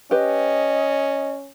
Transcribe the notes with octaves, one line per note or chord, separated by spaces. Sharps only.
C#4 G4 B4 D#5